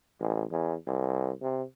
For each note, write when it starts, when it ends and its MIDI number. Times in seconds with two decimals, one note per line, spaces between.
0.20 0.44 33
0.51 0.75 40
0.87 1.32 36
1.42 1.63 48